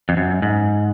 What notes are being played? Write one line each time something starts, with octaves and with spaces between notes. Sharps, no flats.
F2
F#2
G#2